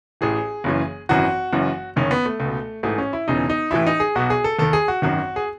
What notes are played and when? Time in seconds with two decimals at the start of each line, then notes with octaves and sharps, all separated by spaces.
0.21 A1 A2 E3 G#4
0.64 F#1 F#2 C#3 E3
1.09 G#1 F#2 E3 F#4
1.53 F#1 F#2 E3
1.96 F#1 F#2 D#3 C#4
2.11 B3
2.26 A3
2.40 C#2
2.45 B2
2.83 A1 G#2 E3 A3
2.98 C#4
3.13 E4
3.28 E1 E2 C#3 E3 D#4
3.50 D#4
3.71 A1 A2 E3 E4
3.87 D#4
4.00 G#4
4.15 B1 B2 F#4
4.30 G#4
4.44 A4
4.59 D#2 D#3 A4
4.73 G#4
4.88 F#4
5.02 G#1 F#2 D#3 F#4
5.36 G#4